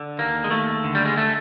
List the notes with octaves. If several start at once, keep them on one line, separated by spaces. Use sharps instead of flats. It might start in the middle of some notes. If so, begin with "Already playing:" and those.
Already playing: D3
D#2 A#3
G#3
D#2 A3
D3
G3
G#3
A3